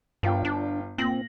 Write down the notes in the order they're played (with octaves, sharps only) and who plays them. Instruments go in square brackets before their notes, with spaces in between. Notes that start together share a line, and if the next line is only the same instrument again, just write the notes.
[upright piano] G1 F4 G5 [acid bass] G2
[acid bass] D4
[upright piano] A#2 A#6 F#7 [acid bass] C4